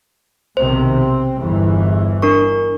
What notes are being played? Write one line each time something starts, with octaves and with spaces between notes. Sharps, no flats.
B1 C3 D#3 C5
C4
G1 E2 E3
D4 A#4 C#6